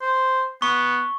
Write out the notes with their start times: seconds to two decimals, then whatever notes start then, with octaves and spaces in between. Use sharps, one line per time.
0.02 C5
0.62 B3 C#6